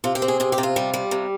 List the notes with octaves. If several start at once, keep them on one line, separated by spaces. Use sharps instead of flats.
C3 F4
G4
C4
G#4
C3 G#4
G4
C3
F4
G3
G3
C3